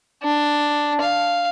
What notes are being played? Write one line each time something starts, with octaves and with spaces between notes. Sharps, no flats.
D4
F5